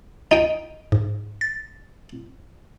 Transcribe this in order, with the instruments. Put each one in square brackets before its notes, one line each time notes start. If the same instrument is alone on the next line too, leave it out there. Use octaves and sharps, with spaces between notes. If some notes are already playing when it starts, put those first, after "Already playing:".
[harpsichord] D#4 G5
[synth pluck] G#2
A6